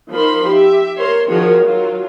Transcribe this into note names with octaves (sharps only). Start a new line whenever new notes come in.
F3 D#4 A#4 C5 B5 C6
G4 E5
A#4 C5 C#5 C6
D#3 F3 F#4 G#4 A#4 C#5
F#3 F4